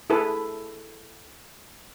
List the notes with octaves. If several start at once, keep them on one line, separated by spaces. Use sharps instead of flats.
E4 G#4 A4 B4